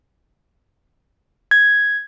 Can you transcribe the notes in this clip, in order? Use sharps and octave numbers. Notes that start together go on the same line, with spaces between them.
G#6